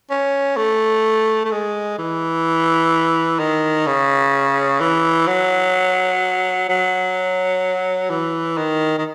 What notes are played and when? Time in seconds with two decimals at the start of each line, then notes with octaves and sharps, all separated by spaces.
0.10 C#4
0.57 A3
1.45 A3
1.51 G#3
1.98 E3
3.39 D#3
3.86 C#3
4.80 E3
5.27 F#3
6.69 F#3
8.10 E3
8.57 D#3
8.98 D#3